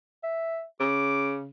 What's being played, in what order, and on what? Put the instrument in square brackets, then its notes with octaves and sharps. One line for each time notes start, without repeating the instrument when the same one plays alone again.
[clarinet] E5
[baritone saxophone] C#3 [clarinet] D6